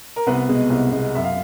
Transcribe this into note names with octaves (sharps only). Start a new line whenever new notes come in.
A#4
C2 B3 B4
B2 G#3
C2
B2 G#3
F#2 E5
F5